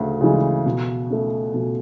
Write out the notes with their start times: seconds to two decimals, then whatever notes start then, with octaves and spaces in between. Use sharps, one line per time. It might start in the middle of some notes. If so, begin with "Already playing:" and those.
Already playing: D2 C#3
0.21 C#3 E3 G#3
0.65 B2
1.10 A3 C#4
1.54 B2